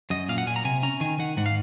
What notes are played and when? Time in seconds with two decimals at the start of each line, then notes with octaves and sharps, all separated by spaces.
0.10 F#2 D#5
0.29 A#2 F5
0.38 F#5
0.47 A#2 G#5
0.56 A#5
0.65 C3 G#5
0.83 C#4 A#5
1.01 D#3 G#5
1.19 D#3 F#5
1.37 G#2 F#5
1.46 F5